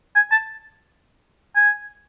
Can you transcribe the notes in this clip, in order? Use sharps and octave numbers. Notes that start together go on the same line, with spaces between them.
G#5
A5
G#5